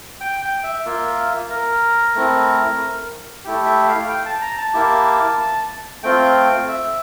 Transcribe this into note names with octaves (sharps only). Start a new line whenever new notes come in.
G5
G5
E5
A#3 F4 E5
A#4
A3 C4 E4
A3 E4 G4
E5
F5
G5
A5
A#5
A5
A#3 E4 G4
A3 C4 F4 G5
E5